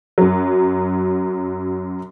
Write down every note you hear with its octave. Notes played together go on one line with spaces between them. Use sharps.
F#2 F#3